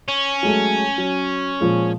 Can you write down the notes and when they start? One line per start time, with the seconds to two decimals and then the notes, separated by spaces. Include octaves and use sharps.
0.08 C#4
0.43 F#3 G#3 A3
0.98 F#3
1.61 A#2 F3 G#3